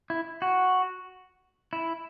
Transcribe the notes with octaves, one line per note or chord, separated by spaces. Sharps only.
E4
F#4
E4